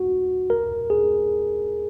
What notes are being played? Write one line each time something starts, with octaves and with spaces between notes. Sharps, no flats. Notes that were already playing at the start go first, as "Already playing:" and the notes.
Already playing: F#4
A#4
G#4